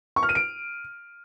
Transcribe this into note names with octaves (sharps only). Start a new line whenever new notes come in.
C#6
F6
D#7
D7